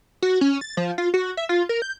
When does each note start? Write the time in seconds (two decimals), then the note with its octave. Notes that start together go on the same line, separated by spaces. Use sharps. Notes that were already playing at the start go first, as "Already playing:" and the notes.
0.22 F#4
0.41 C#4
0.61 A6
0.77 F3
0.98 F4
1.14 F#4
1.37 E5
1.49 F4
1.69 A#4
1.82 G6